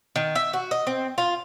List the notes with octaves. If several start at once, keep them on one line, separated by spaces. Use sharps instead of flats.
D#3
E5
F#4
D#5
C4
F4